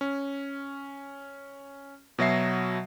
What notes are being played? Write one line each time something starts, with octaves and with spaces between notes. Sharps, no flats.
C#4
B2 F#3 E5 C7